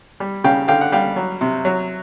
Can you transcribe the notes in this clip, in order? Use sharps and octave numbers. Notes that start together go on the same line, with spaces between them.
G3
C#3 F5 G5
D3 F5 G5
F#5
G3 F5 G5
F#3
C3
F#3